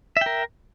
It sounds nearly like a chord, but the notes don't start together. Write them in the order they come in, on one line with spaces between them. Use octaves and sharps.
E5 G5 A#4